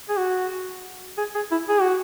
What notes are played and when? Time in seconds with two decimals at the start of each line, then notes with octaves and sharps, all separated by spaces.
0.09 G#4
0.17 F#4
1.18 G#4
1.35 G#4
1.51 E4
1.69 G#4
1.81 F#4